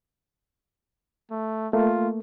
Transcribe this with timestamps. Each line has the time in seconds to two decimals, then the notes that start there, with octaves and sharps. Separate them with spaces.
1.31 A3
1.73 A3 A#3 F4